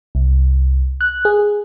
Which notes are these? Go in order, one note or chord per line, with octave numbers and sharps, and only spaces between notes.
C2
F#6
G#4